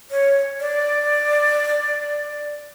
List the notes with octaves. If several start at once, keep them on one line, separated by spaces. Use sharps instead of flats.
C#5
D5